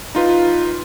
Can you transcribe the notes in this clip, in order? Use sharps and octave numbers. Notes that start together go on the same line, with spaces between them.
D#4 F4 B4